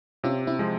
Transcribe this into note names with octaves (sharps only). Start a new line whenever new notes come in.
C3 C#4 F4
C4 E4
F3 G#3